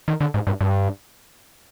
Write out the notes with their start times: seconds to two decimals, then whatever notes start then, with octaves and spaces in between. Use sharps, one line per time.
0.08 D#3
0.21 D3
0.34 G#2
0.47 G2
0.61 G2